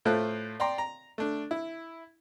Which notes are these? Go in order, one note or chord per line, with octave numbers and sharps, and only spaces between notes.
A2 A3 F4 C5 F#6
D5 G5 A#5 C6
A#5
A3 D4
E4